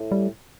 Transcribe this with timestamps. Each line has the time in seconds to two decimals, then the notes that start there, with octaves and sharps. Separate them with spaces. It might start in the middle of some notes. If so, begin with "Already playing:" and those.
Already playing: A2
0.12 G3